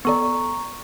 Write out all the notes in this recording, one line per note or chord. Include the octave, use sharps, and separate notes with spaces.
B3 A4 D5 A#5 C#6